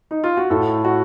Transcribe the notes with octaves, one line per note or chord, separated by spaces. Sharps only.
D#4
F4
F#4
A2 A4
F#4